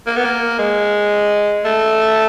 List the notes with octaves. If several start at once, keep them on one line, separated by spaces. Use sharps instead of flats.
A#3
B3
A#3
G#3
A3